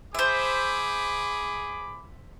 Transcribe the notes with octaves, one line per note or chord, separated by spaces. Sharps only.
G#4 C5 E5 B5 D6